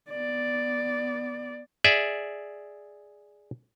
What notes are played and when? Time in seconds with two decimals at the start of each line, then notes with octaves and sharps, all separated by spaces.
0.10 B3 D5
1.84 G#4 D5 E5